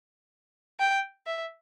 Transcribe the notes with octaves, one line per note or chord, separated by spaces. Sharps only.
G5
E5